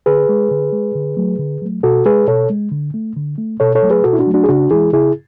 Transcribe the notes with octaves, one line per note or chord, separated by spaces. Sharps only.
D3 G#4 B4
G#3
D3
G#3
D3
F#3 A3
D3
F#3 A3
B2 F#4 A4
G#3 G#4 B4
B2 A4 C#5
G#3
D3
A3
D3
A3
B2 A4 C#5
A4 C#5
F#3 A3
G#4 B4
B2 F#4 A4
E4
D4 F#4
F#3 A3
D4 F#4
G#4
C#3 D4 F#4
E3 G#3 E4 G#4
C#3 E4 G#4